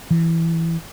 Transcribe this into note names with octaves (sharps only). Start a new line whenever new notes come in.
E3